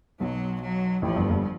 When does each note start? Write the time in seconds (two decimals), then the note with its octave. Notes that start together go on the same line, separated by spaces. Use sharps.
0.20 B1 B2 F#3
0.62 F#3
1.02 A1 A2 F3
1.16 G1 G2
1.29 G1 G2